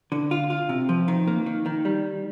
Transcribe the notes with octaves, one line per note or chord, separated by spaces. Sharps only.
D3
F4
F4
C3
F3
D#3
A#3
D#3
D#3
G3